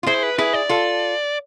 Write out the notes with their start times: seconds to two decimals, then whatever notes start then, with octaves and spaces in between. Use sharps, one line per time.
0.03 F4
0.06 E4 G#4 C5
0.23 B4
0.38 E4 G#4 B4
0.53 D5
0.69 F4 A4